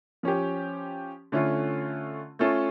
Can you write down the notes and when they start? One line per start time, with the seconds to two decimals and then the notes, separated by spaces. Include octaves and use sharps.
0.23 F3 C#4 G4
1.32 D3 A3 C#4 F4
2.39 A3 C#4 F4 A4